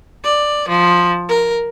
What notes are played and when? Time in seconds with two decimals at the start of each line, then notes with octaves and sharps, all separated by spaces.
0.24 D5
0.69 F3
1.29 A#4